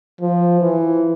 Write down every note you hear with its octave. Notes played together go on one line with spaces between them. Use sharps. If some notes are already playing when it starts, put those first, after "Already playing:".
F3
E3